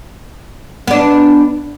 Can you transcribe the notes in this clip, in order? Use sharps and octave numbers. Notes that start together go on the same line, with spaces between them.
B3 D4